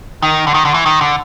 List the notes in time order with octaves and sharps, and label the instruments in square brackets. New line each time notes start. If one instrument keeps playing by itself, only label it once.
[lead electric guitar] D#3
D3
D#3
D3
E3
D#3
D3